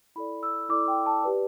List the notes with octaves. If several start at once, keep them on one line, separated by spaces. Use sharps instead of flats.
E4 A4 D5 B5
E6
E4 A4 D5 D6
G5
A5
G4 B4 D5